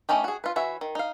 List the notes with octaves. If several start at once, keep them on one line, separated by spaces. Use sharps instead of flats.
A3 C#4 D#4 G4
F#4 G#4
F4 B4
E3 F#4 C#5 E5
D#3
D#4 F5